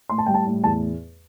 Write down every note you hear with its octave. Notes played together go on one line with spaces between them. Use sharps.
A2 C6
A5
G3 G5
A5
A2
E2 A5